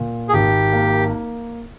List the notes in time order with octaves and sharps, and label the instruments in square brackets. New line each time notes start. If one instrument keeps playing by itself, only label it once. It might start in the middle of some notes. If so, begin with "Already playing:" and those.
Already playing: [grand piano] A#2
[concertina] G#4
[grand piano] G#1 [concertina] G4
[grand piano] A#3